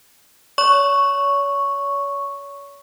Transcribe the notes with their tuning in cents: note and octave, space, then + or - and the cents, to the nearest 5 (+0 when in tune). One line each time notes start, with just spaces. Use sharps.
C#5 +35 C#6 +0